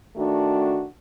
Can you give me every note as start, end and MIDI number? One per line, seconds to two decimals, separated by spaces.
0.16 0.84 51
0.16 0.84 57
0.16 0.84 62
0.16 0.84 66